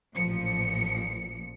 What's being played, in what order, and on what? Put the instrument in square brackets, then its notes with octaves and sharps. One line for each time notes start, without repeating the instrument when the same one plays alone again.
[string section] A1 A#2 F3 C#7